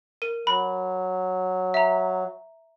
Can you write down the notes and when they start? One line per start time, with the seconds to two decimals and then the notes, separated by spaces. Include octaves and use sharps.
0.22 A#4 D#7
0.47 F#3 B5
1.74 E5 A#5